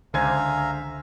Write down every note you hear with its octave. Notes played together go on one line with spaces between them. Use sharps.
C#2 D3 C5 E5 F5 G#5 A#5 G#6